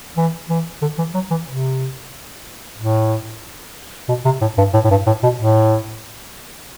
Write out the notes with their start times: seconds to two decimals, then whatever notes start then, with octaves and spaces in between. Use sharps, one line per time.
0.17 E3
0.49 E3
0.82 D3
0.98 E3
1.15 F#3
1.31 E3
1.47 C3
2.78 A2
4.09 B2
4.25 C3
4.41 A2
4.58 G2
4.74 A2
4.84 A2
4.91 G2
5.07 A2
5.23 B2
5.39 A2